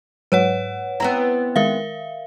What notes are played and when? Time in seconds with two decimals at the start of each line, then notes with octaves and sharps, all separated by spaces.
0.32 G#2 F#3 B4 C#5 F#5 D#7
1.00 B3 C4 E4 A#5
1.56 D#3 G#3 A#4 E5 F5